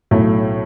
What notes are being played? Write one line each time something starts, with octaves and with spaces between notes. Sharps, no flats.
B1 A2 F#3 A3